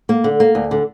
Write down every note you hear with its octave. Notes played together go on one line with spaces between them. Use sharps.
A#3
D3
A#3
D2
D3